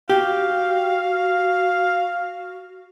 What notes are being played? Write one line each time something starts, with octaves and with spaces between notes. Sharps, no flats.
F#4 G4 F5